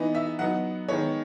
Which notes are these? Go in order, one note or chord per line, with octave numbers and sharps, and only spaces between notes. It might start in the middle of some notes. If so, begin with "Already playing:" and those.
Already playing: E3 B3 D#4
E5
F#3 B3 D#4 F#5
D#3 G#3 B3 C#5